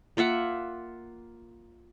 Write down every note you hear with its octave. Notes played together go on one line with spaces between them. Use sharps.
A#3 F4 E5 F#5